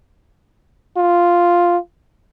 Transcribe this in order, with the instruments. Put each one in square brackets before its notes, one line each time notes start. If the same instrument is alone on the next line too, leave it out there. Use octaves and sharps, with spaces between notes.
[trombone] F4